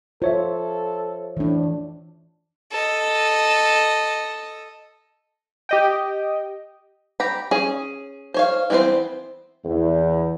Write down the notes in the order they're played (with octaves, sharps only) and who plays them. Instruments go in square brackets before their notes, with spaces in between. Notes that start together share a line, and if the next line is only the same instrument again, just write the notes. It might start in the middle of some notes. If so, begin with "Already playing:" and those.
[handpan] F4 [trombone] A4 [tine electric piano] C5 C#5 E5
[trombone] A2 [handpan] E3 D4
[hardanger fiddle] A4 D#5
[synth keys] G4 D#5 G5
[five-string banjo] G4 A#5 B5
C#4 G#4
C5 C#5 F5
E3 B3 C4 D#4 C5
[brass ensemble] E2